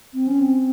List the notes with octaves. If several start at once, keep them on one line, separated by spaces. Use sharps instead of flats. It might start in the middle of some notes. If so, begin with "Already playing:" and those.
C4
C#4
C4